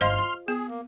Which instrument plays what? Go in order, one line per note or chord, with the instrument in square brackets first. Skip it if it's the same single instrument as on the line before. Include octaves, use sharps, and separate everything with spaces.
[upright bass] G1 [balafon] C5 D#5 F5 [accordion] C6 F6
[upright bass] F4
[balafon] B3 [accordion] G#4
[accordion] A#3